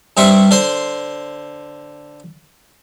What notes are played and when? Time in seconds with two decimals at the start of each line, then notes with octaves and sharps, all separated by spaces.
0.17 G2 C4 C5 E5 C#6
0.51 D3 C5 C6